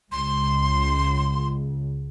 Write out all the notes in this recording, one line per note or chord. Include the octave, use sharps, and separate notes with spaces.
C#2 C6